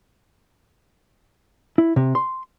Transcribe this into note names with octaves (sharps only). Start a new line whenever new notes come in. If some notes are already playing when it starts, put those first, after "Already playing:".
E4
C3
C6